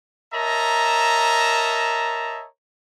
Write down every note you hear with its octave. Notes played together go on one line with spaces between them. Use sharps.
A#4 C#5 D#5 E5 A5 A#5